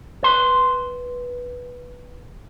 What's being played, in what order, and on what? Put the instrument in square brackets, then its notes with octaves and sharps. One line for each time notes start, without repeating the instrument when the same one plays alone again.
[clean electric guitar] B4 C6